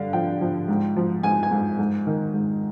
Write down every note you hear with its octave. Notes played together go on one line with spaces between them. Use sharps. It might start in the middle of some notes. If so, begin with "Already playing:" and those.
Already playing: G2 D3 F5
F3 G5
F3
G#2
F3
G#2 G#5
G#5
G#2
G#2
D#3
G#2